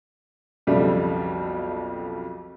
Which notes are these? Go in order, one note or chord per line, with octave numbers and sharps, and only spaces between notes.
B1 F2 C#3 G3 A3